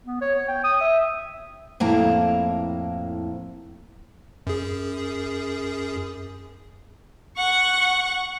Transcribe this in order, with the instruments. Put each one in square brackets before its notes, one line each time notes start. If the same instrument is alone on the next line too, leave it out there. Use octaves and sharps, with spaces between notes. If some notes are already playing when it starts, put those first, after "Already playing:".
[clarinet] B3
C#5
C#5
G5
D#6
E5
[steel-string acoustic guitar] F2 A2 A#3 E4 A5 A#5
[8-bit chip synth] F#2 G#4
[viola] F#5 C#6